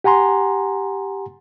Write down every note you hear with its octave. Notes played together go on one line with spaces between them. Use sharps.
G4 F#5 G#5 A#5 C6